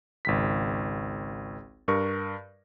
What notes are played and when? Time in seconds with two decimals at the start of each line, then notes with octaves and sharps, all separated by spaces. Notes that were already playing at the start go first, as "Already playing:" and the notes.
0.25 G#1 C#2 B6
1.88 G2 A#4 C#6